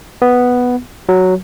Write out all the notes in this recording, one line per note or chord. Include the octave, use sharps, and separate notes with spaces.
B3
F#3